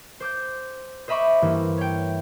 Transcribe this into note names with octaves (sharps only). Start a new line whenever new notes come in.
C5 D6 G6
C5 D#5 E5 B5 C#6 D6
G2 E3 A#3 E4
C#5 G5